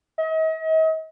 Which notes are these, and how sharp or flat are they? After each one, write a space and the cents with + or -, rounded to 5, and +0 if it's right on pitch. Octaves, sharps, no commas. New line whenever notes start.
D#5 +40